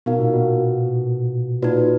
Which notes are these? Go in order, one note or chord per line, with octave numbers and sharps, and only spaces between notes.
B2 B3 D#4 A#4 F5
A#2
B2
A#2 D#4 F#4 B4